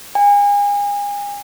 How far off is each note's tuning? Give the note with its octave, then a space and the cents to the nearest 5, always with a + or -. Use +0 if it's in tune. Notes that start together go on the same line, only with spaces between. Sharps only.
G#5 -35